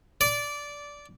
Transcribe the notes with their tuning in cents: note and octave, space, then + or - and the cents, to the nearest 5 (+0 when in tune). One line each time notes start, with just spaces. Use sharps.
D5 -15